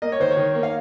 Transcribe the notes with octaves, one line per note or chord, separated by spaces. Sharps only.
A#3 D#5
C#5
D#3 C5
C#5
D#3
A#3
F5